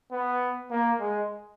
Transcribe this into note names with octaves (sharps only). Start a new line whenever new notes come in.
B3
A#3
G#3